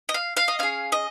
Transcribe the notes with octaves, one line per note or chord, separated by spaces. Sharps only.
D#5
F5
F5
D#5
C#4 G#4 F5
D#5